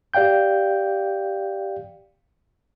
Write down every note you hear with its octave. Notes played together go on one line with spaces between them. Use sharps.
G4 D5 F5 G5 G6